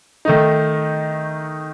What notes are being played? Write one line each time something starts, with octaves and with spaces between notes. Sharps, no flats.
D#3 A3 D#4